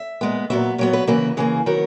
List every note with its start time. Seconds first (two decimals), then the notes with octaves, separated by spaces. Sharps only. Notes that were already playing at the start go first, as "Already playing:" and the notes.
Already playing: E5
0.21 A#2 G#3 B3
0.50 A#2 F#3 B3 E5
0.78 A#2 F#3 B3 C#5
0.93 B4
1.07 C#3 E3 A#3 B4
1.37 C#3 E3 A#3 G#4
1.66 D#3 F#3 B3 A#4